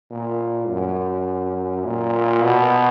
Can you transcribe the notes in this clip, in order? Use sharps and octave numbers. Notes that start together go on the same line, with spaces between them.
A#2
F#2
A#2
B2